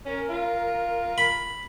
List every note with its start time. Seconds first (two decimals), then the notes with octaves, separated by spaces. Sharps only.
0.06 C#4 A#4
0.29 F4
1.18 B5